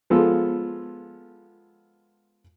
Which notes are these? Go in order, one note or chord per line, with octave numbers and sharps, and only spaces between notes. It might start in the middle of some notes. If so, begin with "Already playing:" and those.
F3 G#3 B3 F4 A4